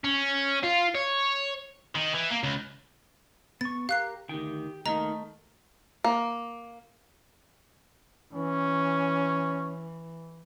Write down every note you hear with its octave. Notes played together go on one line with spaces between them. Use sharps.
C#4
F4
C#5
D#3
E3
A#3
C#2
B3 C#6 A6
G4 A#4 F5 F#6 C7
D2 D#3 G4 G5
D#2 D#3 A3 D#5 A#5
A#3
E3 C#4